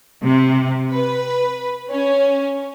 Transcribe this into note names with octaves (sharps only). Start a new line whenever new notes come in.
C3
B4
C#4